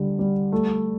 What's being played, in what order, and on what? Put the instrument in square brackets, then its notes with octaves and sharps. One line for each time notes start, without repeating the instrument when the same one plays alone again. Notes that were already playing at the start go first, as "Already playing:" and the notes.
Already playing: [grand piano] D3 G3
G3
A3